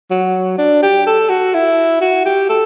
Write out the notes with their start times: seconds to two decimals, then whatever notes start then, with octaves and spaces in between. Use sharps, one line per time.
0.11 F#3
0.58 D4
0.83 G4
1.07 A4
1.29 F#4
1.54 E4
2.01 F#4
2.25 G4
2.49 A4